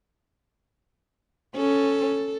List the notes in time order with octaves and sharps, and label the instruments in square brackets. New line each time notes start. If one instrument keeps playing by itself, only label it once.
[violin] C#4 [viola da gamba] A4